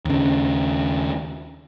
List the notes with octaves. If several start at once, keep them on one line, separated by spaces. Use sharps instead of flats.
D#2 C#3